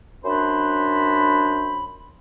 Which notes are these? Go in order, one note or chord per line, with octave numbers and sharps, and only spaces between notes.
F#2 D4 C5 B5